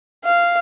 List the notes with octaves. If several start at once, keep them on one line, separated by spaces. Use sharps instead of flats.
F5